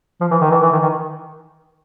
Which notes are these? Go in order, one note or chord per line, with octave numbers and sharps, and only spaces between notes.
F3
E3
D#3
E3
E3
D#3
D#3